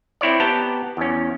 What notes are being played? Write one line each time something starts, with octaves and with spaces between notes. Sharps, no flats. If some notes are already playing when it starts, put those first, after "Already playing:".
C4 E4 C#5 D5
B3 G4 G5 A5 A#5
E2 C#4